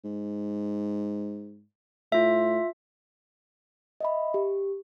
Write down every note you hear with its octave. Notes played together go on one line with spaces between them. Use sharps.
G#2
A2 F4 E5
D#5 E5 B5
G4